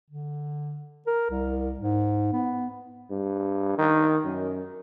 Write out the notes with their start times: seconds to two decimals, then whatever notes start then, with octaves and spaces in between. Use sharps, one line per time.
0.10 D3
1.07 A#4
1.31 C2
1.80 G#2
2.33 B3
3.11 G2
3.78 D#3
4.25 F#2